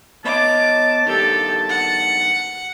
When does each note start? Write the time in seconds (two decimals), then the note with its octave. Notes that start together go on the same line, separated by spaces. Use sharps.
0.25 B3 C#5 D#5 A5 D6
1.06 G2 D#3 G4 A4
1.69 F#5